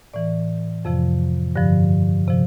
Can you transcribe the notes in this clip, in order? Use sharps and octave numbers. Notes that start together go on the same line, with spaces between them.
A2 E3 D5
F2 C3 F3
G2 D3 F3
C3 F3